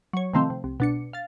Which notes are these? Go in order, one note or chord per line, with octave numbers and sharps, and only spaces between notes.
F#3 C#5
C3 D#3 F3 A3 C4
C3
C2
B2 D4 C#7
F5 A6